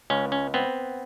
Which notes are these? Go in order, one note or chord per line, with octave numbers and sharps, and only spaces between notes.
C#2 C#4
C#4
B3 C4